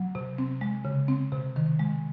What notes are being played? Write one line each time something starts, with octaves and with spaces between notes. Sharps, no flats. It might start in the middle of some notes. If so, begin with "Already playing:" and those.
Already playing: F#3
C3
C4
G#3
C#3
C4
C3
D#3
G#3